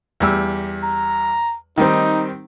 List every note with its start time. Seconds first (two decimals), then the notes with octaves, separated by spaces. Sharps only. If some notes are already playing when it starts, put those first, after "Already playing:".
0.20 E2 G3 E6
0.83 A#5
1.78 D#3 G3 C4 D#4